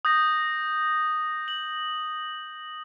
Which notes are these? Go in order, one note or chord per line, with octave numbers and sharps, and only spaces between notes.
D#6 G6 A#6
F#7